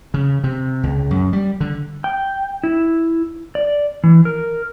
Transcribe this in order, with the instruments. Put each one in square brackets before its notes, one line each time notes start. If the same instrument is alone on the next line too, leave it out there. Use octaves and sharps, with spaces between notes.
[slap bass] C#3
C3
C#2
F#2
G3
D3
[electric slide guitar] G5
E4
D5
E3
A#4